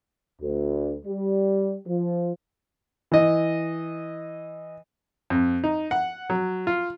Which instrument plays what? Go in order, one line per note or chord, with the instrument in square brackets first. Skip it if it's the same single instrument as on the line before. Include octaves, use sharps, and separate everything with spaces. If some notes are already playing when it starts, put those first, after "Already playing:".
[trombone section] D2
G3
F3
[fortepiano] E3 D#5
F2
D#4
F#5
F#3
F4